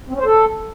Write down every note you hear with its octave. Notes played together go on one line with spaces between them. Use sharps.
C4
C#4
C5
A4